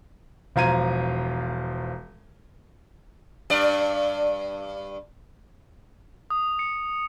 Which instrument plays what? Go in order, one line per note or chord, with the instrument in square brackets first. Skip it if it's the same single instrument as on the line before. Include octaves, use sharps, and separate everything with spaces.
[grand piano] E1 F3 F4 A#5 G#6 D#7
[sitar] G2 D5
[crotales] D#6
C#7